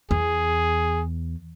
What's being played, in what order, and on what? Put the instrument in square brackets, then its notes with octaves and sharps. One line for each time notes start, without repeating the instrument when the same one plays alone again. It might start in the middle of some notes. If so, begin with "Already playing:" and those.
[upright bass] E2 [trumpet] G#4